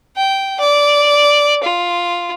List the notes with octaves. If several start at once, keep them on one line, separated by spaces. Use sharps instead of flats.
G5
D5
F4